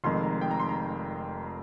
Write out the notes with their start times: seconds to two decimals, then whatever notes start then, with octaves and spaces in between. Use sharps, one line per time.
0.04 F1 F2 D#3 G#3 C6
0.23 A#5
0.41 G5
0.51 A#5
0.60 C6
0.69 A#5